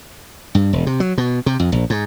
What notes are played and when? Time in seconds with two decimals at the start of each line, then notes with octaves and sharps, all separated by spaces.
0.55 G2
0.73 E1
0.87 C3
1.00 F#3
1.18 B2
1.46 C3
1.60 F2
1.72 A#1
1.90 G#2